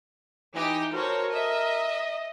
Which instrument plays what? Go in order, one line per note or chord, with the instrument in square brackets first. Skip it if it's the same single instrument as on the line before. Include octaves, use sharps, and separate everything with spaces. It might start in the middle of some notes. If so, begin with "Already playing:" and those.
[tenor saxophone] E3 [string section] D#4 G4
[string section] F#4 C#5 [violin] A4 C5 [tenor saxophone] A#4
[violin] D#5 [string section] E5